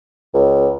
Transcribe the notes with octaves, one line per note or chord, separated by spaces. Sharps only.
C#2